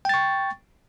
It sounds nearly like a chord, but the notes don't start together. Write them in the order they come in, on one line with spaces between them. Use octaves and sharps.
G5 A6 C#6